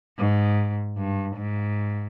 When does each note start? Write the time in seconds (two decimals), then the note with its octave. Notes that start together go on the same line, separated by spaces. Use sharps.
0.18 G#2
0.98 G2
1.36 G#2